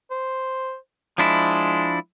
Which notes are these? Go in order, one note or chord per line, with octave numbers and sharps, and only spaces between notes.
C5
F3 G#3 D4 E4